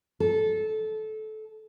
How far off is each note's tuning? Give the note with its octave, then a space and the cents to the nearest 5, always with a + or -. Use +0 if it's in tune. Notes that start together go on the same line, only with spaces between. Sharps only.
A4 -20